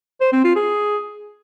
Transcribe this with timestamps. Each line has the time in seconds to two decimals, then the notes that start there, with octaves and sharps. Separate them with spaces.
0.21 C5
0.32 C4
0.44 F4
0.56 G#4